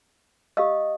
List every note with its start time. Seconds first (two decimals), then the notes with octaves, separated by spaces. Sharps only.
0.57 G4 D#5 F5 E6